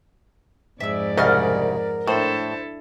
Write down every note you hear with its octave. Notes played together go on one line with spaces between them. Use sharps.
F2 G#2 D5 E5 E6
C2 C#3 A#4 D#5 F#5 F6
A2 D4 E4 A4 C5 C6